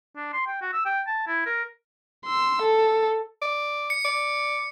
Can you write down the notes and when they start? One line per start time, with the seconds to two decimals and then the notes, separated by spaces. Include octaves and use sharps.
0.16 D4
0.33 C6
0.47 G5
0.62 F#4
0.73 E6
0.85 G5
1.07 A5
1.27 E4
1.46 A#4
2.26 C6 E6
2.62 A4
3.42 D5
3.90 C#7
4.05 D5